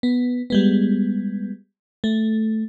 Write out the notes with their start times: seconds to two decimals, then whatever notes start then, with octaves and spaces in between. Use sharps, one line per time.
0.03 B3
0.50 G3 G#3 B3
2.04 A3